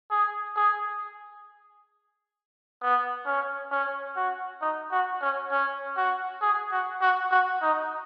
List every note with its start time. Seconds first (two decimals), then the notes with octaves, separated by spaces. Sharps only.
0.11 G#4
0.56 G#4
2.81 B3
3.26 C#4
3.71 C#4
4.16 F#4
4.61 D#4
4.91 F#4
5.21 C#4
5.51 C#4
5.96 F#4
6.41 G#4
6.72 F#4
7.01 F#4
7.31 F#4
7.62 D#4